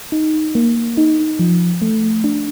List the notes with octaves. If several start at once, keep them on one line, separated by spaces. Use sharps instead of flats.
D#4
A#3
D#4
F3
A3
D4